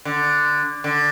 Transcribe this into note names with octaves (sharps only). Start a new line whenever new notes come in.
D3
D3